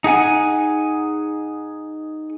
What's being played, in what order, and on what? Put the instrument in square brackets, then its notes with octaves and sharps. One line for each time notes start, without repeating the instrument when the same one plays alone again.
[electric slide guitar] D#4 G#4 F#5 G#5